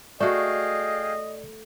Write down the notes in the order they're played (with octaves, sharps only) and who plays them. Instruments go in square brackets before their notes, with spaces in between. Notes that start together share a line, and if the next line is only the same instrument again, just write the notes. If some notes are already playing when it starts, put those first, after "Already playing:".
[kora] A3 F#4 [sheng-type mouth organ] G#4 F5 G5 [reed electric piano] D5 [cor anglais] D#5